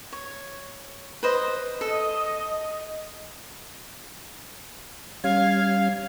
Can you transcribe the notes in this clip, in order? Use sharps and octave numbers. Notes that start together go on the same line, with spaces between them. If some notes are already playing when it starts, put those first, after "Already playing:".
C#5
B4 C5 D#5
A4 D#5
G3 C#4 F5 G#6